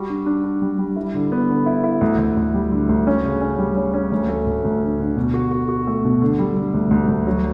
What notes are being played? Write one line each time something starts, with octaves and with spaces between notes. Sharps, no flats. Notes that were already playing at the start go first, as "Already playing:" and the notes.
Already playing: G3 F#4
D4
D4
D4
G3
G3
E4
D3
B3
D3
E4
E4
D2
D2
D2
G3
D3
D2
C#4
C#3
C#4
G3
C#4
C#4
D2
A3
D2
D2
D3
D3
B2
F#4
F#4
F#4
A3
B2
D3
G3
D3
D2
D2
D2
F#3